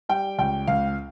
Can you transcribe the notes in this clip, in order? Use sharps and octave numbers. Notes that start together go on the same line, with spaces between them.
G3 G5
C#2 G5
C#2 F5